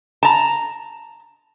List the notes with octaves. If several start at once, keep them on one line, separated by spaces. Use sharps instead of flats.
A5 A#5